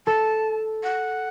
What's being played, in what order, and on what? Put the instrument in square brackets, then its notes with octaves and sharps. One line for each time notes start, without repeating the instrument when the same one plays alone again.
[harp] A4 [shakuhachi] A5
[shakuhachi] F#5